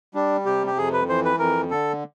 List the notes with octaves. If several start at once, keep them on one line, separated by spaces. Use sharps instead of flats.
G3 D4
C3 G4
G4
F2 G#4
B4
E3 C5
B4
F2 A#4
D3 A4